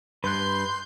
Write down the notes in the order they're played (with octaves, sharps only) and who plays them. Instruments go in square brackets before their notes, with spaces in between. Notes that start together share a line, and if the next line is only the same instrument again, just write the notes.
[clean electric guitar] G2 [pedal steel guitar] B4 F#6 [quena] C6 [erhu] G6